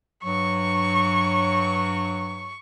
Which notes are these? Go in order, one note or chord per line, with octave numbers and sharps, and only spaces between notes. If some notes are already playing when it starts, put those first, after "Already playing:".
G2 F#3 C#6